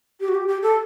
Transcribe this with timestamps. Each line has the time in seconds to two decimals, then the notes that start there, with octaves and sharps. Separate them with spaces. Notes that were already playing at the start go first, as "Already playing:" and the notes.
0.20 G4
0.28 F#4
0.34 G4
0.48 G4
0.62 A4